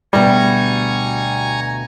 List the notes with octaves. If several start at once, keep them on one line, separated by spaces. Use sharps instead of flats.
D2 B2 G3 G#5 A#5 C#6